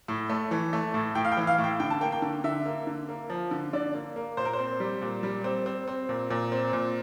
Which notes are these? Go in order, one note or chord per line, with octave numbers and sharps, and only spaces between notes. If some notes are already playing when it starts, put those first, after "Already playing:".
A2
A3
E3
A3
A2
A2 G5
F5
G5
E3
F5
A2
G5
D3 G5
A5
A#3 G5
G5
D3
D3 E5
A#3
D3
A#3
F3
D3
D3 D5
A#3
A#3
A#2 C5
A#4
C5
C4
G3
A#2
G3
C4
C4
C4
A#2
A#2
C4
A#2